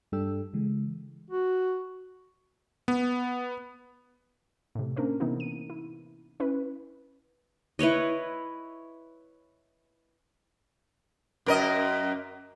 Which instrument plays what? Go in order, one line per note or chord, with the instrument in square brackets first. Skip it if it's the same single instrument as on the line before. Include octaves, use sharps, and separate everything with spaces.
[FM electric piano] G2 G3 D4 A4 G5 E6
C#3 E3 G#3
[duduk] F#4
[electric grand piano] B3
[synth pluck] A2 C3
A#3 C#4 D4 A#4 C5
C3 E3 B3 D#4 E4
D#7
E4
C#4 E4 B4
[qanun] E4 B4 C#5 D#5
[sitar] F#2 A#4 D#5